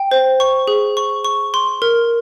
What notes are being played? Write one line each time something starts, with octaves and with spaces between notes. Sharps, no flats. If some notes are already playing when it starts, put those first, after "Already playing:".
Already playing: G5
C5
C#6
G#4
C#6
C#6
C6
A#4